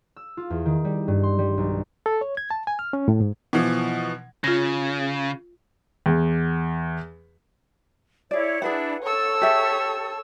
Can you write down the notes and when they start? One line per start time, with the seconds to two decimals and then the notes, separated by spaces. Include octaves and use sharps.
0.17 E6
0.37 F4
0.50 E2
0.65 D#3
0.85 G3
1.08 G2
1.23 C6
1.38 G3
1.58 B1
2.06 A4
2.21 C#5
2.37 G#6
2.51 A5
2.67 G#5
2.79 F6
2.93 C#4
3.08 A2
3.21 G#2
3.53 B2 E3 F3
4.44 C#3 F4 A#6
6.06 E2
8.31 E4 G#4 C#5 D5
8.62 D4 E4 G#4 B4 F#5
9.03 A4 C#5 A5 E6
9.42 G4 G#4 E5